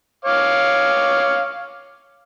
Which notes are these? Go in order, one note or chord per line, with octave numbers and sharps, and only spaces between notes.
C#5 F5 D6